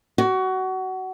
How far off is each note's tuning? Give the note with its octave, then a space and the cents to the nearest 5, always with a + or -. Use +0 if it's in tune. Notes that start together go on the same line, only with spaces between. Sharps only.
F#4 +20